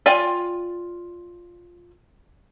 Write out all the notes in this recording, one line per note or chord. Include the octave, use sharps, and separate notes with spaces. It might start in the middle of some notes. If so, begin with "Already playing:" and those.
F4 D5 G5 G#5